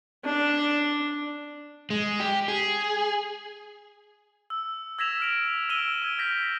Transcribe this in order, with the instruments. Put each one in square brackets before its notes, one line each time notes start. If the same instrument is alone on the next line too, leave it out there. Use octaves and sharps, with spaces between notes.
[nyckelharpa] D4
[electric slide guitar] G#3
G4
G#4
[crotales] E6
E6 G#6 A#6 B6 E7 F7
F6 D7 F7
E6 D7 D#7 G7
E6 G#6
F6 G6 A#6 B6